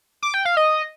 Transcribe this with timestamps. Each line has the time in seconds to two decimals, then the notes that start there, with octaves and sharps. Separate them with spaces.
0.23 D6
0.34 G5
0.45 F5
0.57 D#5